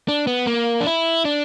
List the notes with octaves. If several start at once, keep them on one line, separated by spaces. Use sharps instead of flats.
D4
B3
A#3
D4
E4
D4